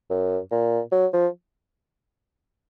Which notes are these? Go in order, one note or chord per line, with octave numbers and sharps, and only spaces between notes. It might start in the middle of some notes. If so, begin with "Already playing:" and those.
F#2
A#2
F#3
F3